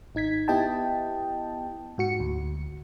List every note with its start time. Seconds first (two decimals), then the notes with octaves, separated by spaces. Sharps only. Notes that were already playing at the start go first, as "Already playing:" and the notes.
0.15 G#1 D#4 G#6 B6
0.48 B3 E4 G4 D#5 G5 A5
1.98 G#2 F#4 C#7
2.20 D2